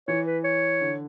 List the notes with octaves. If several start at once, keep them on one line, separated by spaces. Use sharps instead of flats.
E3 C#5
B4
C#5
D3